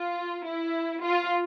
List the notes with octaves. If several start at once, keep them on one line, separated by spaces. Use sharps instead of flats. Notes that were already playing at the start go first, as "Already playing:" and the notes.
Already playing: F4
E4
F4